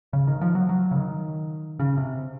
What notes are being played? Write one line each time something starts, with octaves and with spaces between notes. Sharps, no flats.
C#3
D#3
F3
F#3
F#3
C#3
D#3
C#3
C3